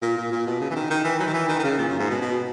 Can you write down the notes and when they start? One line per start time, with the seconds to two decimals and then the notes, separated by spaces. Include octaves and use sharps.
0.02 A#2
0.17 A#2
0.32 A#2
0.46 B2
0.61 C#3
0.71 E3
0.76 D#3
0.90 D#3
1.04 E3
1.19 F#3
1.27 D#3
1.34 E3
1.49 D#3
1.59 D#3
1.64 C#3
1.78 A#2
1.89 F#2
1.99 G#2
2.10 B2
2.22 B2